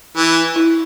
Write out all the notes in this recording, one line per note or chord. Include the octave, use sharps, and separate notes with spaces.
E3
E4